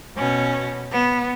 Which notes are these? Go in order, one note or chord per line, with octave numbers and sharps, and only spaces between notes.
B2 C#4
B3